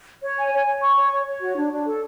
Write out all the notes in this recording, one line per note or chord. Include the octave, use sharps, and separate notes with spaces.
C#5
G#5
C#5
C#5
C#6
C#5
C#5
C#5
F#4
D4
D4
A4